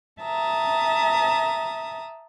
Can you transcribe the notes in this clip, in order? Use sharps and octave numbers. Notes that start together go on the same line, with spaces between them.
E5 A5 A#5 D#6